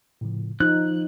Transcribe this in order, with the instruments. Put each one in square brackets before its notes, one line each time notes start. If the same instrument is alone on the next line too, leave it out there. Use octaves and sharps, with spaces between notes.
[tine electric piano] A2 C#3 F3
[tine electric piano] F3 [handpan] D#4 [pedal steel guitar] F#6